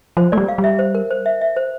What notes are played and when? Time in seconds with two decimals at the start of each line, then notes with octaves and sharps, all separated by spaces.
0.17 F3 C5
0.32 A3 D5
0.37 G3
0.48 F5
0.58 G3
0.64 E5
0.79 C5
0.95 A#4
1.11 C5
1.26 E5
1.41 E5
1.56 C5